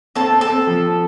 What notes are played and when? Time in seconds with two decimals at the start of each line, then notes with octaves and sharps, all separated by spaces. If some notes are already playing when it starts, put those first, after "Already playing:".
0.16 C4 A4 A5
0.33 C4
0.41 A4 A5
0.50 C4
0.67 F3
0.84 C4